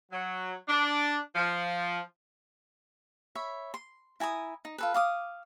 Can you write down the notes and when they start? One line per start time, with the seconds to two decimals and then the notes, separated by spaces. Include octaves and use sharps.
0.12 F#3
0.68 D4
1.35 F3
3.35 C#5 E5 B5
3.74 C6
4.20 E4 G#5 A#5 D#6
4.65 D#4
4.78 F4 A4 B4
4.94 F5 D6 D#6